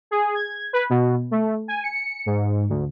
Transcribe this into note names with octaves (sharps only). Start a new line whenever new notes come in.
G#4
G#6
B4
B2
A3
G#5
C#7
G#2
D2